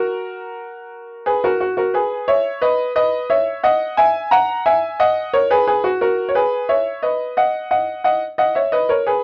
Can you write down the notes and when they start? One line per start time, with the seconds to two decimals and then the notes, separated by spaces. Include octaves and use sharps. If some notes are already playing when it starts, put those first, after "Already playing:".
Already playing: F#4 A#4
1.26 G#4 B4
1.44 F#4 A#4
1.60 F#4
1.77 F#4 A#4
1.94 G#4 B4
2.28 C#5 E5
2.62 B4 D#5
2.96 B4 D#5
3.30 C#5 E5
3.64 D#5 F#5
3.97 E5 G#5
4.31 F#5 A#5
4.66 E5 G#5
5.00 D#5 F#5
5.33 A#4 C#5
5.51 G#4 B4
5.67 G#4 B4
5.84 F#4
6.01 F#4 A#4
6.29 C#5
6.35 G#4 B4
6.69 C#5 E5
7.03 B4 D#5
7.37 D#5 F#5
7.71 D#5 F#5
8.04 D#5 F#5
8.38 D#5 F#5
8.55 C#5 E5
8.72 B4 D#5
8.89 A#4 C#5
9.07 G#4 B4